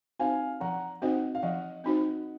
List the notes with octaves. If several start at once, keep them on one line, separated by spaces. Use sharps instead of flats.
C4 D#4 F#4 C5 F5 G#5
F3 F#5 A#5
C4 D#4 F#4 C5 D#5 F#5
F5
F3 D#5 F#5
C4 D#4 F#4 C5